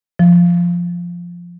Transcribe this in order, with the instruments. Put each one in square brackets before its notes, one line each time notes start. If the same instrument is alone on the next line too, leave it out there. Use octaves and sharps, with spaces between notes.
[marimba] F3